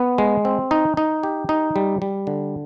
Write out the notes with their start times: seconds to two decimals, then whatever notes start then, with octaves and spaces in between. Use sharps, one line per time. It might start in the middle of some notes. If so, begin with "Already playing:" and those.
Already playing: B3
0.18 G#3
0.45 C4
0.71 D#4
0.97 D#4
1.23 G4
1.49 D#4
1.76 G3
2.02 G3
2.27 D3